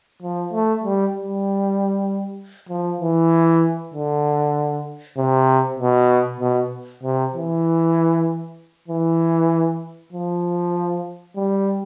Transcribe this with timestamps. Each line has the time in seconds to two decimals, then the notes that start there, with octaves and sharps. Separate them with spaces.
0.22 F3
0.53 A3
0.84 G3
1.16 G3
2.69 F3
3.01 E3
3.94 D3
5.17 C3
5.79 B2
6.40 B2
7.03 C3
7.34 E3
8.88 E3
10.12 F3
11.36 G3